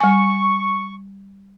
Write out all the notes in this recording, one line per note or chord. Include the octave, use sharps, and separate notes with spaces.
G3 G#5 C#6